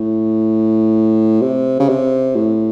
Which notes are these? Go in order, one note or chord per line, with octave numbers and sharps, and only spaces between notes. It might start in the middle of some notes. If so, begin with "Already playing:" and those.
Already playing: A2
C3
C#3
C3
A2